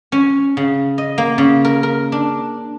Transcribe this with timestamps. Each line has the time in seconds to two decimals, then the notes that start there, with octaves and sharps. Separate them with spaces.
0.12 C#4
0.57 C#3
0.98 D#5
1.18 A#3
1.38 C#3
1.65 A#4
1.83 A#4
2.12 D4